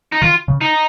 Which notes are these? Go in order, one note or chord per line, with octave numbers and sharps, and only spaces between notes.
D#4
D#3 F4
C#3
D#4